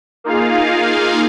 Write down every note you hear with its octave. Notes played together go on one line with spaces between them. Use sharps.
A#3 D#4 F4 G#4 F5